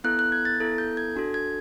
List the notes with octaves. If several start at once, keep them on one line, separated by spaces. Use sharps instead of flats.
B3 E4 A4 F#6
F#6
G#6
A6
B3 E4 A4
G6
G#6
D4 F#4 A4
G#6